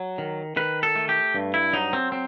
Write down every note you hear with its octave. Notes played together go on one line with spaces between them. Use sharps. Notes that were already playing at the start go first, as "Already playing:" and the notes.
Already playing: F#3
D#3
D#3 B4
A4
A3
G4
G2
E4
F#3 D#4
C4
C4